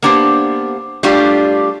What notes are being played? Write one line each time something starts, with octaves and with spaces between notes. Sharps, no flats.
A#3 B3 D4 G4 C5
G3 A3 D4 F4 G4